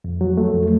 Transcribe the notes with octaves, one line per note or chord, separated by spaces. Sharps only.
F2
F#3
A3
F2